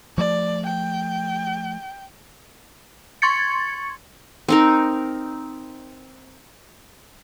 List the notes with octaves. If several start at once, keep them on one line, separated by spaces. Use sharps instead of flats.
F3 A3 D5
G5
C6 C#6 G#6 A6 C#7
C4 D#4 A#4